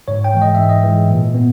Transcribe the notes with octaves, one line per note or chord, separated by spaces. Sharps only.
G#2 C#5
G5
E3 G#3
D#5
G#2 E5
D#5
E3 G#3
A#2
B3